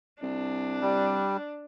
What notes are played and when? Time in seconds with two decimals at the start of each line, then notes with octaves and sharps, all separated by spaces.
0.23 C2 D4
0.82 G3